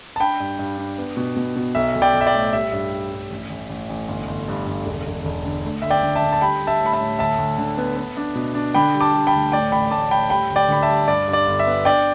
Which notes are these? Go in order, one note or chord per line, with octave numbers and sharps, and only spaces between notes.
A5
D4 G5 B5
G2
G2
D4
B3
B2
B2
B2
B1 E5
B1
D5 G5
B1
E5
D5 G5
A2
G3 E5
G2
G3
G2
A1
A1
A1
A1
G1
G1
G2
G1
E1
E1
E1
D3
A3
D2 E5
D5 G5
D3
E5 A5
D3
A5
G3 G5 B5
G3
E5 A5
A2
B5
E5 A5
A2
D2 E5 A5
D2
D3
B3
B3
D4
B2
D4
D3 G5 B5
G3
A5 D6
G3
G5 B5
D2
A2 D5 G5
A1 G5 B5
A2 A5 D6
A2 G5 B5
G3 G5 B5
D2
D5 G5
D3 B5
E5 A5
G3
G2 D5
G2
D5
G1
E5
B3
D4 D5 G5